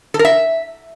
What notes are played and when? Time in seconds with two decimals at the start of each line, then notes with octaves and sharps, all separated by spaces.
0.14 A4
0.19 A#4
0.25 E5